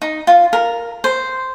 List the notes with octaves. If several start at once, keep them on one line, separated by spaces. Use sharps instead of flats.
D#4
F4
A#4
C5